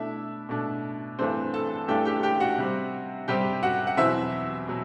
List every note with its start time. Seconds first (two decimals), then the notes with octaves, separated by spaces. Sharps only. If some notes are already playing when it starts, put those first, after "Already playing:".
Already playing: B2 A3 D4 E4 E5
0.49 B2 A3 D4
1.19 G2 E3 A3 C4 D4 C5
1.54 A4 A5
1.88 G2 E3 A3 D4 G4 G5
2.05 G4 G5
2.23 G4 G5
2.40 F#4 F#5
2.58 C3 G3 C4
3.28 C3 G3 C4 G4 G5
3.63 F#4 F#5
3.87 F#5
3.97 E2 B2 F#3 C4 E4 E5
4.68 B2 F#3